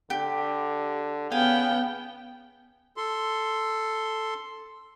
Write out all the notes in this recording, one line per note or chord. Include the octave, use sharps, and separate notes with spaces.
D3 G4
C#3 B3 F5 G5 G#5
A4 C6